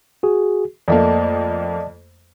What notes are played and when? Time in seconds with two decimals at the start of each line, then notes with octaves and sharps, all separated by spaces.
0.23 F#4 G#4
0.88 F2 A3 A#3 D5 D#5 A5